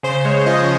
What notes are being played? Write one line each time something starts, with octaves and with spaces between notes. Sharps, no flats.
C#3 C5
C5
G#3 C#5
F3 D#5